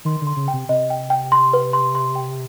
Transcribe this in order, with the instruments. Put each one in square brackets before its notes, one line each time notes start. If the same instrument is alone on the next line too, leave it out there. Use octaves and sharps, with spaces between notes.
[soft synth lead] D#3 [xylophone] C6
[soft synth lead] D3
[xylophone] C6
[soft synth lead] C#3
[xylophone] G5
[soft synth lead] C3
[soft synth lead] C3 [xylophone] D#5
[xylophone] G5
G5
C6
B4
C6
C6
G5